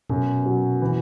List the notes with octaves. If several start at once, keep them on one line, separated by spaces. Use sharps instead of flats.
F#2 B2
F#3
E3